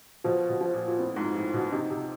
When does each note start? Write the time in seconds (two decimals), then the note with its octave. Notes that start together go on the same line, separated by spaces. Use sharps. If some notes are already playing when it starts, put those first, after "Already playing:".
0.24 B2 F3
0.49 B2
0.61 F3
0.73 A#2
0.88 A#2
0.98 A2 C4
1.16 G#2
1.35 A2 F3
1.53 B2
1.72 C3 D#4
1.90 C3